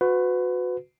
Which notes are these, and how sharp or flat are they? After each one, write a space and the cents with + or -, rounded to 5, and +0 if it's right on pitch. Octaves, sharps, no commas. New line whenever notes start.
F#4 -20 B4 +25